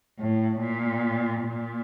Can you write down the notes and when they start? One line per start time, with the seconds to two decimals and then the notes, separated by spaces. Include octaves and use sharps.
0.19 A2
0.60 A#2
1.41 A#2